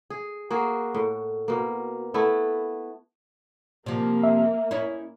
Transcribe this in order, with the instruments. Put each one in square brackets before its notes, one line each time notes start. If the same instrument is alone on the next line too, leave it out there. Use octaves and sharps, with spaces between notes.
[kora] G#4
A#3 F#4 G#4
A2
B2 A#3
A3 B3 E4
[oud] C3 F3 [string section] A#3
[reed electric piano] E5
[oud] C#4 D#4 E4